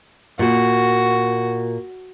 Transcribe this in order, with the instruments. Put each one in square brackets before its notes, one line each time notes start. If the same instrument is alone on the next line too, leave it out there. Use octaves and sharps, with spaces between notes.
[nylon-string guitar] A#2 [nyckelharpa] F#4